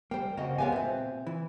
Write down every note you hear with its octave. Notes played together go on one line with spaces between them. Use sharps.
G3 A#3 C5 G5
C#3 A#3 C4 F#4 D#5
G#3 B3 G4 C#5 F5 G#5
A#2 C4 C5 E5
E3